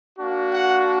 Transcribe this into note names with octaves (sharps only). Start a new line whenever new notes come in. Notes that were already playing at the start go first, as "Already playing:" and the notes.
A#3 D4 F#4
F#5